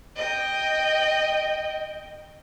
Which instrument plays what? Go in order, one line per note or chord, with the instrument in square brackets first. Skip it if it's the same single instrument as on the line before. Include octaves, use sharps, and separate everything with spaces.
[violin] D#5 G5